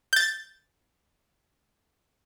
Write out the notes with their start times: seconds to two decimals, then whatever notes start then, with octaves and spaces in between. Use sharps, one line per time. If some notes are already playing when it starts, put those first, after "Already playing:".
0.13 G6 A6